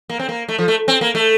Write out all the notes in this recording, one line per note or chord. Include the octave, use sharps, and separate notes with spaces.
A#3
C4
A#3
A3
F3
A3
C4
A#3
A3